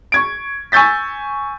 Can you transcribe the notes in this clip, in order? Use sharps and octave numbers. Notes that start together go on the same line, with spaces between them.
C#6 G#6 D7
G#5 C#6 E6 G6 A6 B6